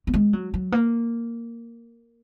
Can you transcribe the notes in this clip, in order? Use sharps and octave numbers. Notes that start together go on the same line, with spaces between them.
A#3
G#3
F#3
F#3
A#3